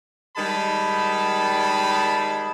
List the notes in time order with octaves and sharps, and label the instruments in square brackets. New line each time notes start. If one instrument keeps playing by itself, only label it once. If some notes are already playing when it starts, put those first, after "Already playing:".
[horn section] D#3 G3 G#3 A5 B5